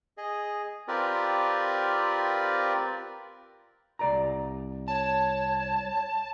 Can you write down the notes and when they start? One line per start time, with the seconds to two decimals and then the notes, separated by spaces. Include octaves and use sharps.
0.17 G#4 D#5
0.88 C4 F4 G4 A#4 B4 D5
3.99 C2 D5 A#5
4.88 C#5 A5